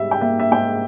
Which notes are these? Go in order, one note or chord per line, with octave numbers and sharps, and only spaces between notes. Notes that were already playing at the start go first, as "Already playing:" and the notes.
Already playing: G#2 G3 E5
G5
A#3 E5
E5
G#2 G5